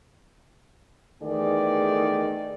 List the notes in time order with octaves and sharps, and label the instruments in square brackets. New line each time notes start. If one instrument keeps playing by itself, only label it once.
[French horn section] E2 D#3 E3 A3 G#4 D5